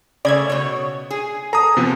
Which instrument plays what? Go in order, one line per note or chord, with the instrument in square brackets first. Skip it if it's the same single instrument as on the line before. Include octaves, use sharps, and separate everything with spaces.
[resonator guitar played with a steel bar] C#3 A3 [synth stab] D5 G#6
[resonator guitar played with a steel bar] B2 C#5
G#4
[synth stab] A4 [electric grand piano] A#5 D#6
[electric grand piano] C3 F3 B3